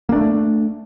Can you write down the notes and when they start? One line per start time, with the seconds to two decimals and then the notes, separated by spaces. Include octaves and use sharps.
0.09 A#3
0.12 D4
0.16 A3